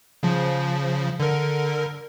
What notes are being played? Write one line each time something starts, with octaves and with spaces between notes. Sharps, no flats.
C#3 F3
D3 A#4